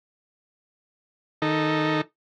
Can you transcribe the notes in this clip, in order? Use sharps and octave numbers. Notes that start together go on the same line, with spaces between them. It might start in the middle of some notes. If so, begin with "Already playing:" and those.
D#3 D#4 A4